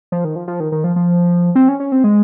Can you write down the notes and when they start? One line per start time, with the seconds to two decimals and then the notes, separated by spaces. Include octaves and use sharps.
0.12 F3
0.25 D#3
0.36 F3
0.48 F3
0.60 D#3
0.72 D#3
0.84 F3
0.96 F3
1.55 C4
1.68 C#4
1.80 C#4
1.92 C4
2.04 G#3